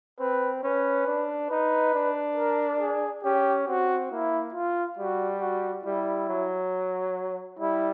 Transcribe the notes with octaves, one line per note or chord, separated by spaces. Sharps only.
C4 B4
C#4 B4
D4
D#4 B4
D4
A#4
G#4
C#4 G4
C4 F#4
A#3 E4
F4
G3 F#4
F#4
G3 E4
F#3
G3 E4